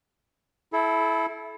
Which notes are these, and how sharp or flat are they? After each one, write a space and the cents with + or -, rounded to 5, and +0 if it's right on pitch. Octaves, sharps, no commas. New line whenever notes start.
E4 +0 A4 -30